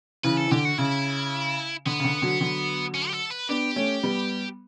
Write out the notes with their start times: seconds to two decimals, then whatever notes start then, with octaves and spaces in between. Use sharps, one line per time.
0.24 C#3 E3 B4
0.37 A4
0.47 E3
0.51 D3 G4
0.65 F#4
0.78 C#3 E4
1.86 D3 B3
2.00 C#3
2.04 D3
2.22 D3 F#3
2.41 D3 F#3
2.94 C#4
3.08 G4
3.13 A4
3.30 B4
3.49 B3 D4 G4
3.76 A3 C#4
4.03 G3 B3